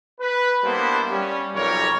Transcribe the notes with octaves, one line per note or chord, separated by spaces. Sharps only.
B4
G3 A#3 B3 D4 E4 C5
G3 C#4
B1 F2 G3 A#4 C#5